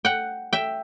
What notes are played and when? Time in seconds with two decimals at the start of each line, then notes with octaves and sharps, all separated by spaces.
0.05 F#5 G5
0.53 E5 G5